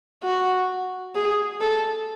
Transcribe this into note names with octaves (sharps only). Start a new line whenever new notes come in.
F#4
G#4
A4